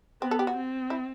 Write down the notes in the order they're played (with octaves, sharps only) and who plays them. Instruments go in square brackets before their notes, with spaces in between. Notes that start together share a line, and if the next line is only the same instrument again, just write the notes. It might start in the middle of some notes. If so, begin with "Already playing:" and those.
[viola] B3 [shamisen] C4
[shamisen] A4
G4
F#4
[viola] C4
[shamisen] E4